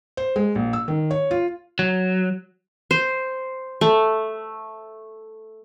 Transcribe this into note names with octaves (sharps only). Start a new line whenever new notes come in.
C5
G#3
A#1
E6
D#3
C#5
F4
F#3
C5
A3